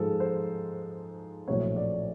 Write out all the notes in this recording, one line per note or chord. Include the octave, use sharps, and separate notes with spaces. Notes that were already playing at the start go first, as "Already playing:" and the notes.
Already playing: G#2 F3 G#3 A4
C5
A#1 A2 F#3 A3 C4 C#5
D5